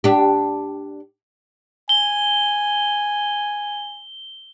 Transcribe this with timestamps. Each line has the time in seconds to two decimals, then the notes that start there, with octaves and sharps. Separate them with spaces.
0.04 D4 G4
1.89 G#5 G7